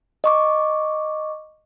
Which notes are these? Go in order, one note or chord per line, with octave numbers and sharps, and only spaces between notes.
D#5 C#6 D6